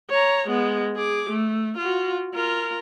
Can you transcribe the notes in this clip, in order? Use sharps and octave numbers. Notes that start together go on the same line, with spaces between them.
C#5 A#5
G#3 B3
G#4 D6
A3
F4 F#4
F4 A#4